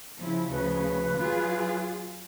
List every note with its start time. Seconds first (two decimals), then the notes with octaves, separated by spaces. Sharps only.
0.20 C#3 F3 E4
0.52 D2 C#3 F3 B4
1.19 F#3 F4 G#4